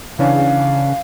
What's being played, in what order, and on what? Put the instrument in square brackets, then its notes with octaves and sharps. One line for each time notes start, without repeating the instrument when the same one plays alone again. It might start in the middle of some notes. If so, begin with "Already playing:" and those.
[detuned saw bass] C#3 [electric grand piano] E3 C#4 D4 [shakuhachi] F5